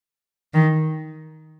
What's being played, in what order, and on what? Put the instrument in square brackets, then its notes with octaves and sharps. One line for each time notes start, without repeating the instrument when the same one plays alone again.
[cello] D#3